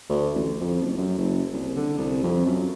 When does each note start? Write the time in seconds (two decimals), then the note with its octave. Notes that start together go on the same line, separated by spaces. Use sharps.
0.09 D2
0.35 A1
0.60 F2
0.81 F#1
0.97 F#2
1.18 F#1
1.53 C2
1.76 D3
1.98 C2
2.23 F2
2.46 F#2